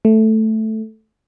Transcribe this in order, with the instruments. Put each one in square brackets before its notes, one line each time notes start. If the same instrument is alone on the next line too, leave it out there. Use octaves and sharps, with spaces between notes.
[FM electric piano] A3